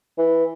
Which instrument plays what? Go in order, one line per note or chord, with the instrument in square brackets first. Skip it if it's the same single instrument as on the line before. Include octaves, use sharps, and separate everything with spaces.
[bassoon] E3